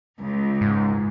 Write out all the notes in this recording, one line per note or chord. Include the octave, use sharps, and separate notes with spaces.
C#2
G#2